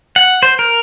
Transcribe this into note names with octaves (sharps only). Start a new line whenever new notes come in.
F#5
C5
A#4